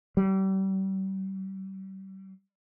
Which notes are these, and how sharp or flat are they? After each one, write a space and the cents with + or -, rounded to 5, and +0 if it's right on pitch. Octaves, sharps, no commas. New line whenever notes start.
G3 -35